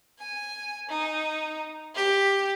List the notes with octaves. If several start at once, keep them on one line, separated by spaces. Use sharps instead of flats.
G#5
D#4
G4